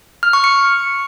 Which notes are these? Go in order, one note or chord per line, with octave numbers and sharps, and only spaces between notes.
F6
C#6
C#7